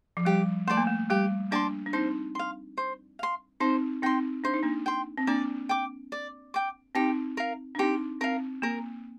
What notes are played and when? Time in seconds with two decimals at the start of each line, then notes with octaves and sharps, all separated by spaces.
0.17 F3
0.25 G3 G4
0.67 A3 D5 A5 C6
0.77 A#3
0.87 A3
1.10 G3 G4
1.51 A#3 D4 D5 A5 C6
1.86 D4
1.93 C4 D#4 C5
2.35 F5 C6
2.78 C5
3.19 F5 C6
3.60 C4 D#4 C5
4.02 C4 D#4 G5 C6
4.44 D4 C5
4.54 D#4
4.63 A#3 D4
4.86 G5 C6
5.18 C4
5.27 A#3 D4 D5
5.69 G5 D6
6.12 D5
6.54 G5 D6
6.95 C4 D#4 G4
7.37 A#4 F5
7.75 D4
7.79 C4 D#4 G4
8.21 C4 A#4 F5
8.62 A#3 A#4